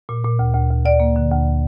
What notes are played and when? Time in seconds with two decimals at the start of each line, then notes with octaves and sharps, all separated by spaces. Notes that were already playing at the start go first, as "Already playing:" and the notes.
0.09 A#2
0.24 A#2
0.39 D2
0.54 D2
0.70 D2
0.85 D2 D5
1.00 A#3
1.16 D3
1.31 D2